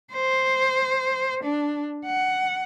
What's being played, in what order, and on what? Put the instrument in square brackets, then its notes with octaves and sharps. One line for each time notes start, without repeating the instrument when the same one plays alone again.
[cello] C5
D4
F#5